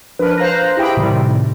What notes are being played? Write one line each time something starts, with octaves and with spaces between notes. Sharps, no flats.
F3 D4 A#4 B4
C5 F5 A#5 F#6 A#6
E4 G4 G#4 E5 G5 B5
A2 C3 D#3 G3